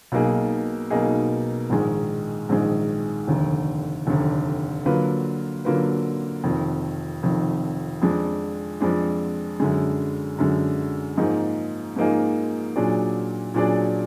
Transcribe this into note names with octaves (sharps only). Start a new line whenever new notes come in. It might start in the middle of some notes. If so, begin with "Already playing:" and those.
B1 B2 A#3 D#4 G#4
B1 B2 A#3 D#4 G#4
A#1 G#2 D#3 G#3
A#1 G#2 D#3 G#3
F1 D#2 D3
F1 D#2 D3
D3 F#3 A#3 F4 B4
D3 F#3 A#3 F4 B4
F1 F2 D#3
F1 F2 D#3
F2 F3 G#3 D4
F2 F3 G#3 D4
F#2 D3 G#3
F#2 D3 G#3
G#2 F3 A#3 D#4 G#4
G#2 F3 A#3 D#4 G#4
A#2 F#3 D4 G#4 D5
A#2 F#3 D4 G#4 D5